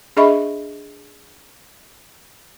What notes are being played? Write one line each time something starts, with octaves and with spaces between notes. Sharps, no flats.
D4 G#4 D#5 E5 B5 C#6